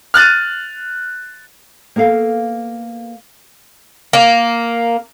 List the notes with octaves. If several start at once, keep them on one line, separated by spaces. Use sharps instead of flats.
F6 F#6 A6 D#7
A#3 B3 A4 F5
A#3